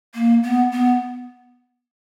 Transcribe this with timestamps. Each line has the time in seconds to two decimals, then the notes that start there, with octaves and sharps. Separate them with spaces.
0.14 A#3
0.43 B3
0.72 B3